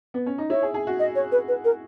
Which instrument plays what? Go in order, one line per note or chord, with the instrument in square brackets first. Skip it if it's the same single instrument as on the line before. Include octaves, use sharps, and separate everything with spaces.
[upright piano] B3
C#4
D#4
[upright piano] E4 [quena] C#5
[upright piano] G#4
G#4
F#4
[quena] D#5
C#5
B4
B4
A#4